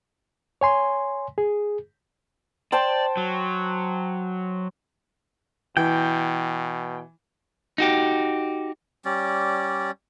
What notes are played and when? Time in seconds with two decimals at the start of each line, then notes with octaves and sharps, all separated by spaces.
0.61 C#5 G#5 C6
1.38 G#4
2.72 C5 D5 G5 A5
3.17 F#3
5.77 B2 E3 G5
7.78 D#4 F#4 G4
9.05 G3 C#4 D5